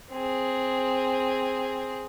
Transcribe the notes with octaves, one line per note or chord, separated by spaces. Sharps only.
C4 G#4